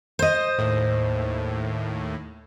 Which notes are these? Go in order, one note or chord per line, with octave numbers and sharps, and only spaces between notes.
C5 D#5
D#2 A2